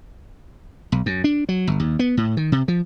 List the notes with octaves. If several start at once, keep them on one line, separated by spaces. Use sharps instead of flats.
B1
F#2
D4
F#3
G1
D#2
B3
A2
D#3
C3
F3